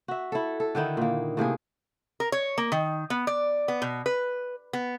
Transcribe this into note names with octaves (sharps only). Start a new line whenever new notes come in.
F#4 E5
E4 A4
A4
D3 D#3 D#4 E4
A#2 A#3
A2 C3 A#3 G#4
A#4
C#5
A#3
D#3
B3
D5
B3
B2
B4
B3